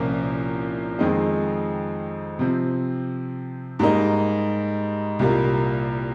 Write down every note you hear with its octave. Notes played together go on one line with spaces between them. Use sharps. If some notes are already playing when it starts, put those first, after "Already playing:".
Already playing: C2 A#2 F3 A#3 C#4
F2 D#3 G#3 C4 D#4
C3 F3 C4
G#2 G3 A#3 D#4
C2 A#2 G3 A#3